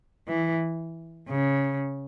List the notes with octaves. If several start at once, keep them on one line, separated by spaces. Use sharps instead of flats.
E3
C#3